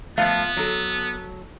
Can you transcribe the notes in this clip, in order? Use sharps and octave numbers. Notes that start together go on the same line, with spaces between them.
F3 A3 B3 F5
F#3 A4